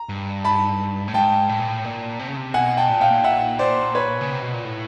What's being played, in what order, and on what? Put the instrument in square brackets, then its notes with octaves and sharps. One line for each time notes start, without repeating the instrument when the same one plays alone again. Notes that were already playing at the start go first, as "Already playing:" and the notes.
Already playing: [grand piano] A#5
[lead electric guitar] G2
[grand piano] A5 B5
[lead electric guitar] A2
[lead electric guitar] G#2 [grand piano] G5 A5
[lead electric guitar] A2
A#2
A2
A#2
C3
C#3
C3
[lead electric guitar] B2 [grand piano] F#5 G#5
[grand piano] G5 A5
[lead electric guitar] A#2
[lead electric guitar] A2 [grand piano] F5 G5
[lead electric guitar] A#2
[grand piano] E5 F#5
C5 D5
B4 C#5
[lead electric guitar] C#3
C3
B2
A#2
A2